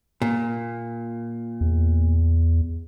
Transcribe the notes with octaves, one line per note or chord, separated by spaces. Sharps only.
A#2
E2